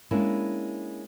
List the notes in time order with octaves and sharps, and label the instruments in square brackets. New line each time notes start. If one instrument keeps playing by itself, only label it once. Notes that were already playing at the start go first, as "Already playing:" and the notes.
[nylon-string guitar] G#3 A#3 C#4 D4 E4